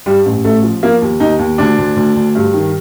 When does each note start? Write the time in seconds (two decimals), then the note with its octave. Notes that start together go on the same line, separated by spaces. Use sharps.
0.06 G2 G3
0.26 A1
0.44 A1 A3
0.63 F3
0.83 F3 A#3
1.02 D#2
1.20 D#2 D#4
1.39 D#2
1.58 D2 D4
1.78 D2
1.96 D2
2.16 D2
2.35 G2
2.53 D#3